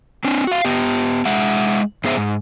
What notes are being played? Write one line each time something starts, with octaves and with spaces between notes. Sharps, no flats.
C4 D4
F#4 F5
B3 G4
G#3 E5 F#5
G#2 B3 G#4 C5 E5
G#2